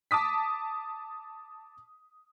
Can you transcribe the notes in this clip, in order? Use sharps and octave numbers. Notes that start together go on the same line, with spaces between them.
A5 D6 D#6 B6